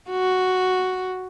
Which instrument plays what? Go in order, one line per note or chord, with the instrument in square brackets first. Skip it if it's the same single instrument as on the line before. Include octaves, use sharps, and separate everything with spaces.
[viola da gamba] F#4